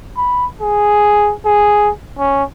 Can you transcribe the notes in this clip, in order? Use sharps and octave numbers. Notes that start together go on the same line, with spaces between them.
B5
G#4
G#4
C#4